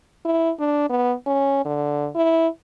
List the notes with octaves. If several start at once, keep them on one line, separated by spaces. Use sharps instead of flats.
E4
D4
B3
C#4
D3
E4